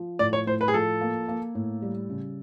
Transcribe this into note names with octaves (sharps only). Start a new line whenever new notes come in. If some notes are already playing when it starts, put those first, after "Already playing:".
Already playing: F3
A2 D5
C#5
A2 C5
B4
G#4
F3 A4
A#3
A#3
A2
G3
C#3